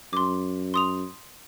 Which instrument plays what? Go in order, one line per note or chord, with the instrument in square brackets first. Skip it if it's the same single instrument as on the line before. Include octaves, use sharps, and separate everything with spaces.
[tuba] F#2 [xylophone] C6 D6
[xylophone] C6 D#6 F7